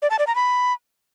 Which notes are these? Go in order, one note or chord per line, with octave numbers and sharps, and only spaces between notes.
D5
A5
D5
A#5
B5